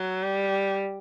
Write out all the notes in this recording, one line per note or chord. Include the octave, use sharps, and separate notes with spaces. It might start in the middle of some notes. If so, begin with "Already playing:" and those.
Already playing: F#3
G3